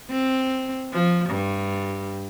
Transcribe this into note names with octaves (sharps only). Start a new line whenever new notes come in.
C4
F3
G2